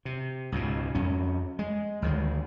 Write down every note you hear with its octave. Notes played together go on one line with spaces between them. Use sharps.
C3
C#2 G#2 B2
F2 C#4
G#3
D2 D#3 E3 G#3